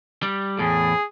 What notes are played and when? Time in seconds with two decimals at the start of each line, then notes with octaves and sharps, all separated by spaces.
0.23 G3
0.59 E2 A2 G#4